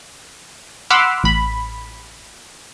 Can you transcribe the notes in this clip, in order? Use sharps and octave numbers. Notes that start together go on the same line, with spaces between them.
F#5 B5 C6 D6 E6 F6
A1 B5